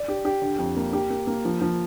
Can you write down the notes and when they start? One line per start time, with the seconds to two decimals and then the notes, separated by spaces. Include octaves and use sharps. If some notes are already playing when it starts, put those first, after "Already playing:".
Already playing: D5
0.08 G4
0.25 G4
0.42 D3
0.59 F2
0.77 A#3
0.93 G4
1.10 A#3
1.27 A#3
1.45 F3
1.61 F3